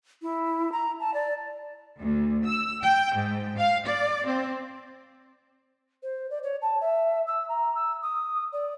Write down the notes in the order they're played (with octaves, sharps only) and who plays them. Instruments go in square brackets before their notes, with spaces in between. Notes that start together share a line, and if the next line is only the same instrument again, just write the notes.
[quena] E4
A#5
A5
D5
[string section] D2
E6
G5
G#2
F5
D5
C4
[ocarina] C5
D5
C#5
A5
E5
E6
A#5
E6
D#6
D5